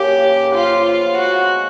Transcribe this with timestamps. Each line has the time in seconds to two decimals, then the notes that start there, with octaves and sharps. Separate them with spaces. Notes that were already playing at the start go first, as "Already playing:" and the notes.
Already playing: F#2 A#3 C#4 G4
0.09 C#3
0.25 C#3
0.40 F#2
0.55 F3 F4
0.71 F3
0.86 E4 F4
1.02 B3
1.16 G#3 F#4
1.32 C4
1.47 F3